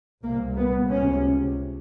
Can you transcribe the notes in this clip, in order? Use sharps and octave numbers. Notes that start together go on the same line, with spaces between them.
C2 A#2 A#3
B3
C#2 C3 C#4